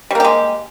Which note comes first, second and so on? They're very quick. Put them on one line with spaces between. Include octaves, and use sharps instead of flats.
G3 A#3 G4 G#3